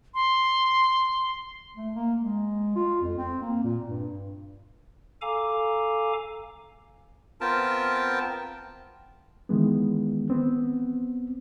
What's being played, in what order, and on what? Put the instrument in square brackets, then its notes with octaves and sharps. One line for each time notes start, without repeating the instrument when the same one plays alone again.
[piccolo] C6
[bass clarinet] A3
A#3
G#3
F4
F2
C4
A#3
A#2
G2
[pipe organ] A4 F5 G#5 A#5 D6
[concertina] B3 C4 F4 A#4 G5 A5
[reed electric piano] D#3 E3 G#3 B3
B3 C4